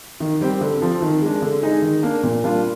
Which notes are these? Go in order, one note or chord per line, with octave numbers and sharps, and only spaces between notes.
D#3
G3 C4 G4
D3
F3 C4
D#3
G#3 D4
D3
G#3 D#4 G#4
D#3
A#3 D4
A#2
G3 A#3 D4 F4